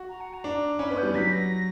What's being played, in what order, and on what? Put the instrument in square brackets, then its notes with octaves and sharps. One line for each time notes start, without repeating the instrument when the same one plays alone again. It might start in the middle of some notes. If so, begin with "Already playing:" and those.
Already playing: [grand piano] F#4
[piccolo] A#5
F#5
A#5
[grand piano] D4
[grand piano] C#4 [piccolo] B5
[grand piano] B3
[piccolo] G6
[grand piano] G3
[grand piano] F#3 [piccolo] B6
[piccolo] A#6